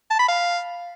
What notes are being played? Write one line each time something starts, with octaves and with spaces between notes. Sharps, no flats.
A5
B5
F5